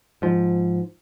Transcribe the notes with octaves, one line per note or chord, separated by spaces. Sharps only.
G#2 F3